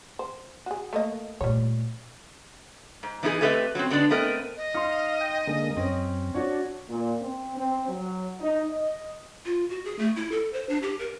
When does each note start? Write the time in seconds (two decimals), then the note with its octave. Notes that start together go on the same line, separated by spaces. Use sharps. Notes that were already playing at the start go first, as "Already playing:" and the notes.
0.19 C5
0.66 F#4 G#4
0.93 A3 A#3 D#5
1.41 A#2 G3 A3 C#5
3.03 G#2
3.23 E3 B3 D#4 F#4 G#4
3.41 A3 C4 G4 B4 D#5 E5
3.75 F#3 C4
3.90 D3 G#3 B3 D4
4.10 A3 B3 C4 A#4 D#5
4.57 D#5
4.74 D#4 F5 C6
5.21 G5
5.47 D3 G#3 A#3
5.77 F#2 C4 C#4
6.34 D4 F#4 C#5
6.89 A#2
7.21 C4
7.56 C4
7.89 F#3
8.41 D#4
8.70 D#5
9.45 F4
9.70 F#4
9.85 G#4
9.99 A3
10.16 E4
10.32 A4
10.53 C5
10.69 D4
10.82 G4
10.99 A#4